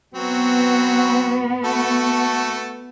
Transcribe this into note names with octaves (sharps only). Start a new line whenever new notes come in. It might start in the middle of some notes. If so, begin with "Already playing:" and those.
F#3 B3 C4 F#4
A3 F#4 A4